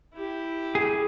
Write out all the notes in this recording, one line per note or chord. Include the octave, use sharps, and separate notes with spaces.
E4 G4
G#4